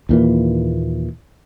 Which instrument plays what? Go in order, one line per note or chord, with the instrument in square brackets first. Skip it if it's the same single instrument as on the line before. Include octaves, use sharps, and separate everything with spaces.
[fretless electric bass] D#2 A#2 E3